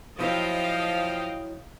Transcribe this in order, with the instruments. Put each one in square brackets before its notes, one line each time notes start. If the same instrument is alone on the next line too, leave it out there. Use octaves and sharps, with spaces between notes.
[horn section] F3 [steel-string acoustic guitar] F#3 E4 C#5 [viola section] D#5 F5 G5